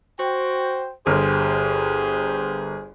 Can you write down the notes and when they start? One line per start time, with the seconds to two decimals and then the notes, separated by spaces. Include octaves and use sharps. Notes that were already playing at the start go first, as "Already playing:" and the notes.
0.20 F#4 C5 G5
1.07 G1 G4 G#4 C5 F6